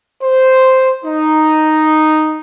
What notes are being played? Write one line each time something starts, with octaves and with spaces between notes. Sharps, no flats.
C5
D#4